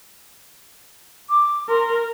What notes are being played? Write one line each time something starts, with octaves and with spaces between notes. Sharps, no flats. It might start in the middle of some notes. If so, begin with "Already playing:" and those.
D6
A#4 C6